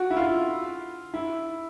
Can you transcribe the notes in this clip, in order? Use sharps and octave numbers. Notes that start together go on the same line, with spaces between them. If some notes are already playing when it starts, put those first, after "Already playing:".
Already playing: F#4
E4
F4
E4